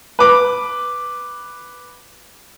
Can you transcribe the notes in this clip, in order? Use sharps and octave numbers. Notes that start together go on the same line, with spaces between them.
B4 D6